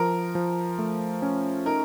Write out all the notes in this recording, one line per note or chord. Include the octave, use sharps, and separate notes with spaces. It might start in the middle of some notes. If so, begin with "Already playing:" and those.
Already playing: F3 A#4
F3
A3
C#4
D#4 A#4